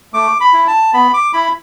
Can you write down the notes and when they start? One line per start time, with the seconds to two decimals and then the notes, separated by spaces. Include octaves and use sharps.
0.13 A3 D6
0.41 B5
0.53 E4
0.67 A5
0.93 B3 B5
1.14 D6
1.34 E4 B5